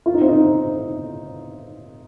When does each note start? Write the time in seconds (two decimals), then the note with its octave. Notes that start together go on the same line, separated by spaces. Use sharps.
0.06 F4
0.14 D#4
0.21 C4
0.28 D#4